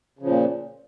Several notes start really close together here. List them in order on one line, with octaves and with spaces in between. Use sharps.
C#3 F3 A#2